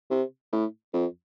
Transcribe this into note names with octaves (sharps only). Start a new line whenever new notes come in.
C3
A2
F2